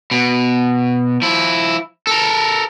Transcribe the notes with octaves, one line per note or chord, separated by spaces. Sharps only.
B2
F3 E4
A4 A#4